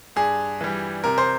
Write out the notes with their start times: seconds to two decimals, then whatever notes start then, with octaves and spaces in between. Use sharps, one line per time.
0.16 G2 G#4
0.61 E3 G3
1.04 C3 A#4
1.18 C5